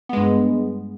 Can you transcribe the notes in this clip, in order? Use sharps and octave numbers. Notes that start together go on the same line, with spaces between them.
G2 G#3 B3